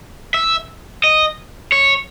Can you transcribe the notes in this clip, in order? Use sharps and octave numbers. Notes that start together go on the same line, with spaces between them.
E5
D#5
C#5